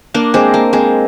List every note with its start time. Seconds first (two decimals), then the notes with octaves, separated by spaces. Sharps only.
0.14 A#3 D4
0.34 G#3 C4
0.54 A#3
0.73 G#3 C4